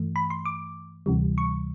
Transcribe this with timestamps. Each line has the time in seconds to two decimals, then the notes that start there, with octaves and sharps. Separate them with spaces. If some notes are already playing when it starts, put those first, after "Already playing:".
Already playing: G2 E3 A3
0.16 B5
0.30 C6
0.45 D6
1.06 D2 C3 E3 G3
1.38 C#6